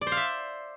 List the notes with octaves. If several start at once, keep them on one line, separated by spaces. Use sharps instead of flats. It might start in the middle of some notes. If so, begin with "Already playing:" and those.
D5
C5
F5
E5